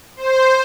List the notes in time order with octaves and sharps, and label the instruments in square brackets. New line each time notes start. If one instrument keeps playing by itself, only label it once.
[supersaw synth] C5